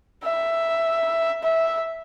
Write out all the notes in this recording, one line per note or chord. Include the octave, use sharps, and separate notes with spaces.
E5
E5